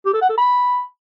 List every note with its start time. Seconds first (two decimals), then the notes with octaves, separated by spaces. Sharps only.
0.05 G4
0.13 A4
0.21 F#5
0.29 A4
0.38 B5